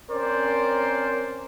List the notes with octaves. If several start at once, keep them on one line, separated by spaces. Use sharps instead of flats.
C4 C#4 A#4 C5 D5